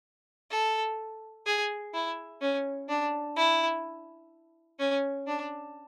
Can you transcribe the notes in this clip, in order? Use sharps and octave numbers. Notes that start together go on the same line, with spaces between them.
A4
G#4
E4
C#4
D4
E4
C#4
D4